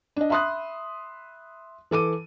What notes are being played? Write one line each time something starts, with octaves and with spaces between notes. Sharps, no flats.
D4 D#5
E5 B5 C6 D#6 F#6
E3 A4 D6 D#7